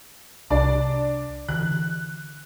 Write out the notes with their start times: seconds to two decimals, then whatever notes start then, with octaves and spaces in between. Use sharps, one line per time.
0.50 C2 D4 D5
1.48 D3 E3 F#6